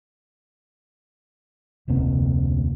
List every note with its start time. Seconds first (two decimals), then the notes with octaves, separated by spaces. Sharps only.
1.88 F1 D2 C3 A#3